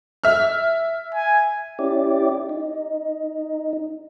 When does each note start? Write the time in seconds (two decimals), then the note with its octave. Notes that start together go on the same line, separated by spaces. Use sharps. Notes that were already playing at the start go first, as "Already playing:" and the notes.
0.24 E5 F6
1.15 G#5
1.79 C#4 E4 G4 D5
2.49 D#4